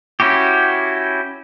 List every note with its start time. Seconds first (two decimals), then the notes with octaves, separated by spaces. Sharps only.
0.20 C#4 E4 F#4 G4